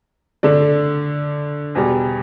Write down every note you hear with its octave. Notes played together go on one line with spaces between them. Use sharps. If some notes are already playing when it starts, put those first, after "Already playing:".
D3 A3 D4
E2 B2 G3